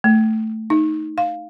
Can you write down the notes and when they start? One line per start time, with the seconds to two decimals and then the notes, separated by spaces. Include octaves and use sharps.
0.04 A3
0.70 D#4
1.18 F5